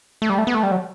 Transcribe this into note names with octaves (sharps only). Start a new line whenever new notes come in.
A3
G3
A3
B3
A3
G3
F#3